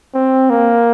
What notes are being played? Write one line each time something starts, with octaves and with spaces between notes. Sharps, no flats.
C4
A#3